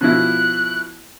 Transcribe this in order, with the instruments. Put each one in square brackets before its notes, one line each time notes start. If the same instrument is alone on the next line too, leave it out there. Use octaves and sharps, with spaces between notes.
[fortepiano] B2 F3 E4 [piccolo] F#6